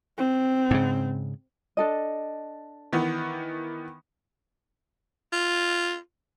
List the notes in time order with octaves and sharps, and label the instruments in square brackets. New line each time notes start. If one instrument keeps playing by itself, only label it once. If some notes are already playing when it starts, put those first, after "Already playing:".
[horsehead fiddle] C4
[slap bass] G#2 C#3
[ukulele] D4 A4 D#5
[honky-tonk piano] D#3 E3 B3
[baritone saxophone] F4